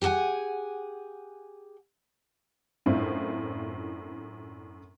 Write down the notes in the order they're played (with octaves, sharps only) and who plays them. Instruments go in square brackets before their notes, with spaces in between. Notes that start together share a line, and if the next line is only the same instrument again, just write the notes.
[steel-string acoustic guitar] G4 G#4 D5 F#5 G#5
[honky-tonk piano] F#2 A2 C4 D4 E4 F4